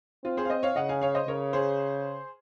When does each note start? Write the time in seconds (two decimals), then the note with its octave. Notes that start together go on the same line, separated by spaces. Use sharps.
0.24 C4 F4
0.37 G#4 C5
0.45 F5
0.50 C5 D#5
0.63 C#5 F5
0.76 C#3 D#5 F#5
0.89 F5 G#5
1.01 C#5 F5
1.15 C5 D#5
1.28 C#3 A#4 C#5
1.53 G#4 C5